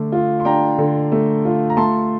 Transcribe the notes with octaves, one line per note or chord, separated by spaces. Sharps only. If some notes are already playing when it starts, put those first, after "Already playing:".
Already playing: D3 A3 D4
F4
C6
D4 G5 A#5
D3
A3
F4
A#5
A3 A5 C6